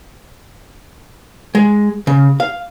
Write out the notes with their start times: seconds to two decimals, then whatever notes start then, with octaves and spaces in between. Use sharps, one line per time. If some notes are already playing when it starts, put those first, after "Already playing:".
1.55 G#3
2.07 C#3
2.40 F5